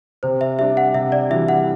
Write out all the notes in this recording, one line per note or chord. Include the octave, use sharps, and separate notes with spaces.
C3 C5
E5
G3 D4 E5
F#5
C3 E5
D5
E3 G3 D4 F#4 E5
F#5